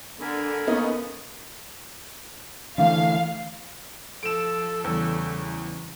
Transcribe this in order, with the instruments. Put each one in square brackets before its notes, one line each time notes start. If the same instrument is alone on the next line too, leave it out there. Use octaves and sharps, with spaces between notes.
[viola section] D3 [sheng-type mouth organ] A#4 G#5 B5
[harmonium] A#3 C#4 [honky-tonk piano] B3 D#4
[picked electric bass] D3 E3 A3 [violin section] F5
[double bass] F3 [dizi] A4 [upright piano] D7 E7
[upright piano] E2 [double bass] C#3 G3